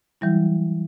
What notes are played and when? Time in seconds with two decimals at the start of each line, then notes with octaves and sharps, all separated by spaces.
0.21 E3 F#3 G3 E4